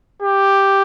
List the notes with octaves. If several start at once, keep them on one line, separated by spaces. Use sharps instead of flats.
G4